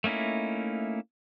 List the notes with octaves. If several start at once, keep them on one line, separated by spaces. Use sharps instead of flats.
A3 A#3 C#4 D#4 E4